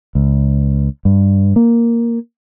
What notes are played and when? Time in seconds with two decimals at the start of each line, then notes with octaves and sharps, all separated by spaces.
0.15 C#2
1.05 G2
1.56 A#3